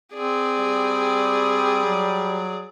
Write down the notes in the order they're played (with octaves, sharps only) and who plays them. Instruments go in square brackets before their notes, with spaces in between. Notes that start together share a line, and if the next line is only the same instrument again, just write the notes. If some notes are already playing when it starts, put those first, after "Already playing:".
[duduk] C4 [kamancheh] G#4 D5
[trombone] G3
[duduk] F#3